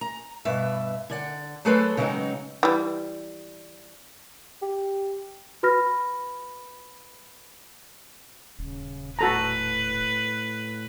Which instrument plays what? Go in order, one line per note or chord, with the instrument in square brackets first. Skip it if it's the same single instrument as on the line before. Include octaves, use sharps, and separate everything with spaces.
[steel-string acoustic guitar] A#5
G2 B2 E5
D3 D5 F#5
F#3 A3 G#4 A4 B4 C5
C#3 F#3 G#3 C4 D#4
[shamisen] E3 G3
[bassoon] G4
[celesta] F#4 B4 B5 F6 A#6
[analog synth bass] D#1 [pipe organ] C#3
[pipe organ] A2 [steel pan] F#4 A4 A#5 [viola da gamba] B4